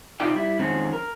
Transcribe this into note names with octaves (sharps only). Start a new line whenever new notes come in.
C3 D#4 F4 D5 G5
G3 E4
F2 D3 D#3 G#3 C4 C#4
A#4